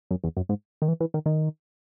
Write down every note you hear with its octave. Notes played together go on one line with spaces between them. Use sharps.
F#2
E2
F#2
G#2
D#3
E3
E3
D#3
D#3